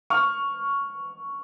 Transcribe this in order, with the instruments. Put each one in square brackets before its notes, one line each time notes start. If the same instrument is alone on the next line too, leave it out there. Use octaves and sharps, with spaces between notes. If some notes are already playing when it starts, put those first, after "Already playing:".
[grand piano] C#6 F6